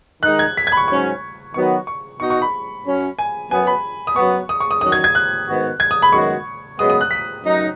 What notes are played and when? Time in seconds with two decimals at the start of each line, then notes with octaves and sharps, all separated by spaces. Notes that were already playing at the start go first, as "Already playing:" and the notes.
0.22 D#3 G#3 D#4 F#6
0.39 G#6
0.57 B6
0.67 G#6
0.72 B5
0.77 C#6
0.88 G#2 F#3 C#4 C#6
1.54 D#3 F#3 B3 F#4 C#6
1.87 C#6
2.20 B2 B3 D#4 F#4 C#6
2.30 C#6
2.42 B5
2.86 F#2 F#3 C#4
3.19 G#5
3.51 F#2 F#3 B3 G#5
3.67 B5
4.07 D#6
4.16 F#2 F#3 B3 C#6
4.49 D#6
4.61 C#6
4.71 D#6
4.81 D#3 F#3 C#4 F#4 D#6
4.92 G#6
5.04 G#6
5.15 F#6
5.47 G#2 D#3 B3 F#4
5.80 G#6
5.91 D#6
6.02 B5
6.12 F#2 D#3 G#3 B3 F#4 C#6
6.78 F#2 C#3 G#3 B3 D#6
6.90 D#6
7.01 F#6
7.11 B6
7.43 F#2 F#3 D#4